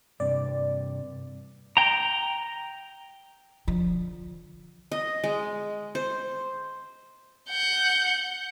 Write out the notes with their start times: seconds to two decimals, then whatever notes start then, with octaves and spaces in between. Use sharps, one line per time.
0.20 G2 C3 D5
1.77 G5 A#5
3.68 D3 F3
4.92 D#5
5.24 G#3
5.95 C5
7.50 F#5 G6